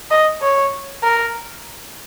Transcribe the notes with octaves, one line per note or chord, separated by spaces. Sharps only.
D#5
C#5
A#4